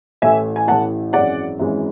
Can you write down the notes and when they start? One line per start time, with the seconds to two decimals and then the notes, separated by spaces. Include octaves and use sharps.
0.22 A1 A2 E3 A3 E5 G#5
0.56 G#5
0.67 A1 A2 E3 A3 F#5 A5
1.13 G#1 F#2 E3 G#3 D5 F#5
1.60 G#1 F#2 E3 G#3